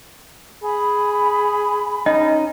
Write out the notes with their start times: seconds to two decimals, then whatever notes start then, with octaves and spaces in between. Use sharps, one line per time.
0.63 G#4 B5
2.06 C#4 D#4 D#5